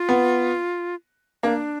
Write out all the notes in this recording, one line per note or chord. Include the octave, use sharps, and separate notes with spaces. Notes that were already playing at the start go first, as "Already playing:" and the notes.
Already playing: F4
B3
A#3 D4